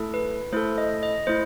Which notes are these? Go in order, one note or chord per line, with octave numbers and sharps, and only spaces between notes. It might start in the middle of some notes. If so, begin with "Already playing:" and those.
Already playing: A3 E4 A4
B4
A3 E4 A4 C5
D#5
D#5
A3 E4 C5